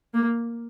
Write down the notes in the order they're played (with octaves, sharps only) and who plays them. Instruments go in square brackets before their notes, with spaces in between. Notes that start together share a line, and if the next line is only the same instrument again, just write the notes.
[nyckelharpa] A#3